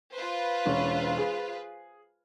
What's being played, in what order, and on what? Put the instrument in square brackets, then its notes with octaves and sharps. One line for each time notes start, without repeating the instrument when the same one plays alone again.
[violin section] F4 B4 C5
[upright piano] E1 C#4
G#4